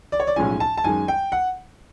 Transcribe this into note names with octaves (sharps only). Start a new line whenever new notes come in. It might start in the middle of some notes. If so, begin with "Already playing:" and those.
D5
C#5
D5
B1 A2 F3 G#3 C#4 G#5
A5
A5
F#2 D#3 G#3 G#5
G5
F#5